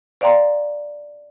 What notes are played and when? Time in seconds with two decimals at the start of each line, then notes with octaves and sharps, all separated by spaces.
0.21 C5 D5 F5 G5 A#5 C6